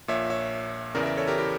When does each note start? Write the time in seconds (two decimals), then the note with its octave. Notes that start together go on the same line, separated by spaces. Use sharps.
0.08 A#1 A#2 C#5 E5
0.30 C#5 E5
0.95 E2 C#3 E3 A#4 D5
1.03 E5
1.06 A#4 D5
1.17 A4 C#5
1.27 G4 A#4
1.38 E4 G4